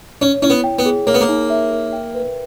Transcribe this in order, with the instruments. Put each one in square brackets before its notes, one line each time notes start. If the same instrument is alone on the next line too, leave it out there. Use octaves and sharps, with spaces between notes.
[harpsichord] C#4 [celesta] C#5
[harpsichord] C#4 [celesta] E4
[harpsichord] B3
[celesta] G5
[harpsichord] B3
[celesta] G#4
[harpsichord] A#3 [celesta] C#5
[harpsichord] B3
A#3
[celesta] D#4
E5
A#4
G5
B4